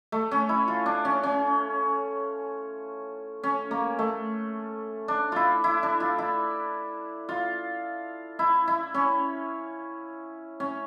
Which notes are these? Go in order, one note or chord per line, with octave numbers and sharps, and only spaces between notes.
A3
C#4
E4
F4
D4
C#4
C#4
C#4
A#3
A3
D4
E4 F4
E4
D4
F4
E4
F4
E4
E4
C#4
C#4